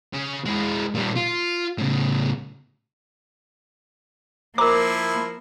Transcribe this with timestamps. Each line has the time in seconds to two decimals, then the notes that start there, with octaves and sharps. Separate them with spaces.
0.13 C#3
0.45 G#3 E4
0.95 A#2 G3
1.16 F4
1.78 A2 C#3
4.58 F3 A#3 E4 A#4 C5 A#5 D6